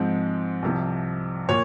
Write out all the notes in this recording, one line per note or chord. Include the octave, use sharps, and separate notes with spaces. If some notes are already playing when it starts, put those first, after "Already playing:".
Already playing: G#2 F3 G#3 C4
C2 C3 F3
A#2 C#5